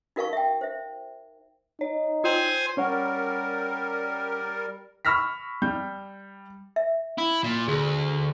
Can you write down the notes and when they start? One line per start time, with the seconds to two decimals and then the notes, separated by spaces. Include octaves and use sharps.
0.16 D#4 F#4 A#4 F5 A5 C#6
0.33 E5 G5
0.61 C5 E5
1.81 D#4 C#5
2.24 F4 C5 G5 G#5
2.77 G3 C#4 A#4 C#5 F#5
5.05 B5 C#6 E6 F6 A#6 B6
5.62 G3 G6
6.76 E5
7.18 E4
7.44 A#2
7.68 D2 G#4